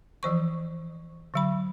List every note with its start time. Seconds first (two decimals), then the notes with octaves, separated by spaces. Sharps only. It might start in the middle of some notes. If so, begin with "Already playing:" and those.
0.23 E3 F3 C5 C#6
1.34 D3 F#3 B5